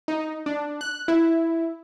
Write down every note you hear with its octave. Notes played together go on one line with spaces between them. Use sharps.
D#4
D4
F#6
E4